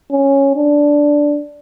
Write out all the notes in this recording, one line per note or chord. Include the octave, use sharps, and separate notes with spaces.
C#4
D4